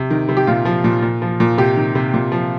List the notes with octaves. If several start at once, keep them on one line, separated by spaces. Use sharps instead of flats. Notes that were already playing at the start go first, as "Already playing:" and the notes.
Already playing: C3
D#3
C3
G4
A#2 F4
F3
A#2
A#2
F3
A#2
C3 G4
D#3
C3
A#2
F3